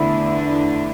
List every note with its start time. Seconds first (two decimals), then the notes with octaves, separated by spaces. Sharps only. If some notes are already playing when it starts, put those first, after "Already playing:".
Already playing: E2 D3 A3 D4 E4
0.46 E4